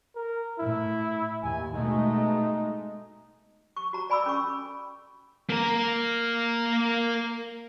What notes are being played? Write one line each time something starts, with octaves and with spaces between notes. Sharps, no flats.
A#4
A2 E4
D#2 G#5
B2 G#3 A3 D#4
C#6
F#4 A#5
D5 G#5 B5 D6 E6
C#4 A4 C#6
A#3 A#4